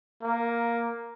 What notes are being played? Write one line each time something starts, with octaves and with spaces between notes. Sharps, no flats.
A#3